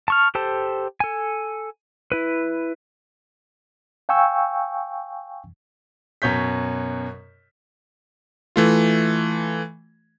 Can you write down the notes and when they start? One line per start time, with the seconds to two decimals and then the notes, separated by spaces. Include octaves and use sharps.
0.08 A5 C#6 F6
0.35 G4 A4 C5 A5
1.00 A4 G#5
2.12 E4 B4
4.09 F5 G5 G#5 C#6 E6 G6
6.22 F#2 B2 C#5 G6 B6
8.56 E3 A3 F4